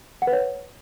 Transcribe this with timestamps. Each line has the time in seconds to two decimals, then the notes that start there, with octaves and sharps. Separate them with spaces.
0.22 F#5
0.27 B4
0.33 C#5